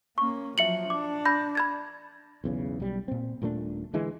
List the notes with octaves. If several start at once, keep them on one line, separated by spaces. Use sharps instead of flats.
A#3 C#4 C#6
F3 F#3 E5 C#7 F#7
D4 D6
B5 G6 A#6
B5 G#6 A6
B1 E2 C#3
B1 G3
A#2 C4
D#1 A#2 A3 D4
D3 E3 G#3